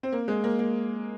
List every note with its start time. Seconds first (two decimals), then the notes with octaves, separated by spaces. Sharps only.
0.03 C4
0.12 A#3
0.28 G#3
0.44 A#3
0.59 A#3